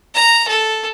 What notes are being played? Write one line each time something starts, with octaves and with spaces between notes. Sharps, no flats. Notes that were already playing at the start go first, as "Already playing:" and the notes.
A#5
A4